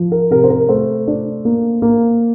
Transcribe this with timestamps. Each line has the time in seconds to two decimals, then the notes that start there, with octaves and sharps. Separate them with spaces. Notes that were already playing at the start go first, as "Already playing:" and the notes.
Already playing: F3
0.12 A#4
0.31 C3 A#4
0.44 C5
0.50 A#4
0.69 A3 C5
1.07 D4
1.45 A#3
1.82 A#3